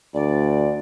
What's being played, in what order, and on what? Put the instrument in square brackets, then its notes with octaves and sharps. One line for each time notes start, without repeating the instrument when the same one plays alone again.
[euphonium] D2 [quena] D5